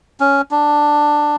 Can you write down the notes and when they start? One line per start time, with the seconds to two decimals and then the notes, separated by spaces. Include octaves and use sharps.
0.20 C#4
0.51 D4